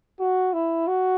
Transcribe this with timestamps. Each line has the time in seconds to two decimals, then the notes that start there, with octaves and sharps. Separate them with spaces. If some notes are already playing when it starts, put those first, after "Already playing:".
0.20 F#4
0.53 E4
0.88 F#4